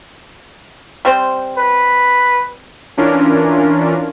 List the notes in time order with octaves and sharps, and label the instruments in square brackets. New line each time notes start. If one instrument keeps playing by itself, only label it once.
[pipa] G3 C4 C5
[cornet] B4
[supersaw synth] E3 C#4 D4 F4 A#4